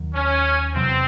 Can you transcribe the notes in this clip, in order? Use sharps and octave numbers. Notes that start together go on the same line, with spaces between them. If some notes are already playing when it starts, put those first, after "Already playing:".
Already playing: D#2 D#3 F#3
C#4
E2 C3 F#3 C4